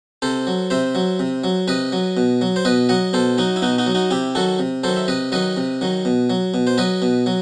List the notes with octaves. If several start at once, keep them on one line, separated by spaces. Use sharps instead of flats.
C3 A4 C5
F#3
C3 C5 E5
F#3
C3
F#3
C3 B4 D#5
F#3
B2
F#3
C5
B2 B4 D#5
F#3 D#5 F#5
B2 A4 C5
F#3 D#4 F#4
E4
B2 D#4 F#4
D#4 F#4
F#3
D#4 F#4
C3 E4 G4
D#3 F#3 F#4 A4
C3
D#3 F#3 A4 C5
E5
C3 B4 D#5
D#3 F#3 B4 D#5
C3
D#3 F#3
B2
F#3
B2
C5
F#3 B4 D#5
B2
F#3